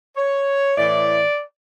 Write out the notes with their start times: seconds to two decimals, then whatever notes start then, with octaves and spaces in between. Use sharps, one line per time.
0.16 C#5
0.78 A2 E3 D5